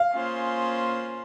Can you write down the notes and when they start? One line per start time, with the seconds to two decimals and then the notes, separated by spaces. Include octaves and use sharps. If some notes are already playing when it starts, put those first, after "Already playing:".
Already playing: F5
0.11 A#3 C#4 F4 G#4 C5